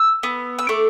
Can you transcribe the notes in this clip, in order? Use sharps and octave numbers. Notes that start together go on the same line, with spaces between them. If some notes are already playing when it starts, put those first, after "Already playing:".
Already playing: E6
B3
E6
A3 D6